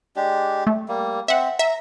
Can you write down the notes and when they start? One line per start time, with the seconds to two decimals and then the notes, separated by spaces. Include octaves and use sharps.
0.16 G#3 D4 G4
0.67 A3
0.88 G3 A#3
1.28 C4 E5 F#5
1.59 E5 A#5